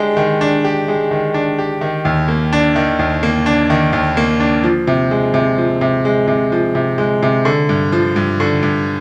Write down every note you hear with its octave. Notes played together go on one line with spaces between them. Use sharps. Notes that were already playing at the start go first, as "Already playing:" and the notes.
Already playing: G#3 D4 G4
D#3
D4
G4
G#3
D#3
D4
G4
D#3
D#2
A#3
D4
D#3
D#2
A#3
D4
D#3
D#2
A#3
D4
F3
C3
G#3
C3
F3
C3
G#3
C3
F3
C3
G#3
C3
D3
G2
F3
G2
D3
G2